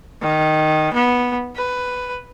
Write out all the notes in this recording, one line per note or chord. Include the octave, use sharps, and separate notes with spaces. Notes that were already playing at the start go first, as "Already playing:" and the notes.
D#3
B3
B4